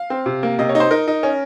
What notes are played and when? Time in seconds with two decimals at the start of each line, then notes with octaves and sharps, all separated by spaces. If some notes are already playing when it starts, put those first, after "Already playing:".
Already playing: F5
0.10 C4
0.26 C3
0.43 A#3
0.59 C3 D#5
0.69 C#5
0.75 D#4
0.80 C5
0.91 D#4 A#4
1.08 D#4
1.23 C#4